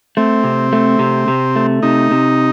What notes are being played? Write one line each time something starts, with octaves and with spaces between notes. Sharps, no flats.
A3 C4
C3
A3
C3
C3
A3
C3 D#4
C3